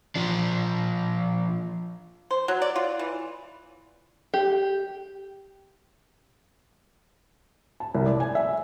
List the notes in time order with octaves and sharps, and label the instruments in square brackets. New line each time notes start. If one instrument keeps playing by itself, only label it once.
[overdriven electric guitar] F3 D4
[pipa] C5
F#3
D5
F4
E3
[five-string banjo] G4
[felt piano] A5
C2
D5
G#5
E5